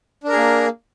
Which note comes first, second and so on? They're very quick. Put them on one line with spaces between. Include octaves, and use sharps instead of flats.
D4 A#4 G#4 A#3